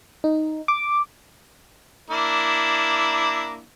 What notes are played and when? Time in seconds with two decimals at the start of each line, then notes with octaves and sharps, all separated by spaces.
0.24 D#4
0.68 D6
2.10 A#3 D4 E4